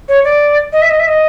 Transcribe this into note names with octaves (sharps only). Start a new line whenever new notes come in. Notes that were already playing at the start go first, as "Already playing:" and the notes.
C#5
D5
D#5
E5
D#5
E5
D#5